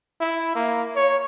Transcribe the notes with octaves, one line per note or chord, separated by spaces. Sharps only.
E4
A#3
C#5